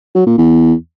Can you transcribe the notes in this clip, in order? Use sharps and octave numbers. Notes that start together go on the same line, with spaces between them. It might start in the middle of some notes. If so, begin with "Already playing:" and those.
F#3
A#2
E2